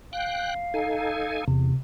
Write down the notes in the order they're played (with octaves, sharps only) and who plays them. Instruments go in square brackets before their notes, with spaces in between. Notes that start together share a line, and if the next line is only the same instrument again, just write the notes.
[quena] F5 [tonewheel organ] G5 F#6
[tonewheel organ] D#4 A4 G#5
[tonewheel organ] E2 [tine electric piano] C3